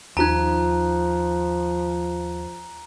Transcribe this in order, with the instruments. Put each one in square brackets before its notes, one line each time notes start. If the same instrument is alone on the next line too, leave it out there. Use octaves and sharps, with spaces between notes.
[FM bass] D#2 [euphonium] F3 [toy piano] D#4 F4 A5 [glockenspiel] A#5 F#6